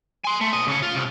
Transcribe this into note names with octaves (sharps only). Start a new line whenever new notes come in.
G#5 C6
A3
B1 D#5
C#3 C#5
F4
C2